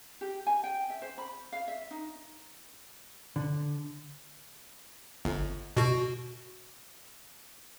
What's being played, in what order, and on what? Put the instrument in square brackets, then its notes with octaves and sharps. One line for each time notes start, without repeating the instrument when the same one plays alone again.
[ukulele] G4
G#5
G5
E5
C5
B5
F5
E5
D#4
[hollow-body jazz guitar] D3
[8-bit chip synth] G1
B2 F#4